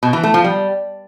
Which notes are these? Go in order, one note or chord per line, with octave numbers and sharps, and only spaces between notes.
B2
E3
A3
F3
G3